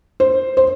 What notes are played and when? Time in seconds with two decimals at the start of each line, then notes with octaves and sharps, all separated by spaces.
0.20 C5
0.57 C5